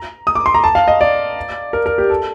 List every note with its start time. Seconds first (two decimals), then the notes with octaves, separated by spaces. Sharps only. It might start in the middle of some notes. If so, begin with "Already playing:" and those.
Already playing: A#5
0.27 D#6
0.35 D6
0.46 C6
0.55 A#5
0.64 A5
0.75 F5
0.88 D#5
1.01 D5
1.73 A#4
1.86 A#4
1.98 G4
2.10 A4